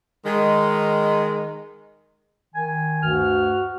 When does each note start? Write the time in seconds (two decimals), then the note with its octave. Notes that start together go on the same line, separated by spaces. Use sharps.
0.25 D#3 G#3
2.54 D#3 G#5
3.03 D2 G2 F#4 F6